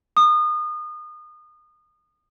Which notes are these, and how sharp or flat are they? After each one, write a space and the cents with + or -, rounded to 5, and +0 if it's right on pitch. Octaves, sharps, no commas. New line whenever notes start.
D#6 -30